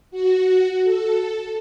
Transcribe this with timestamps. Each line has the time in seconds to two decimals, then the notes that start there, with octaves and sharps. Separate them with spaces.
0.11 F#4
0.83 A4